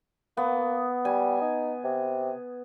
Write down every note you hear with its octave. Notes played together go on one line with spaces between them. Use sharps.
A#3 B3
G3 G#5
D#4
C3